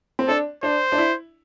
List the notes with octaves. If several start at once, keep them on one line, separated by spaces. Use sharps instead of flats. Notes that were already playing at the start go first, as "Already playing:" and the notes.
C4
D4 A4
D4 C5
D4
E4